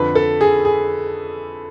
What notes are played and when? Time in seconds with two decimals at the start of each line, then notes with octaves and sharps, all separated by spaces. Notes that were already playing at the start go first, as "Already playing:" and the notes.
Already playing: F2 D3 B4
0.15 A4
0.41 G#4
0.65 G#4